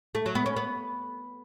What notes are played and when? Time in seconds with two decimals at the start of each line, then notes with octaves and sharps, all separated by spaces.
0.15 A3
0.26 F#3
0.35 B3
0.46 C#4
0.56 B3